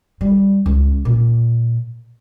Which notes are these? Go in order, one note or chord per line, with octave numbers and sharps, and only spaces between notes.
G3
C#2
A#2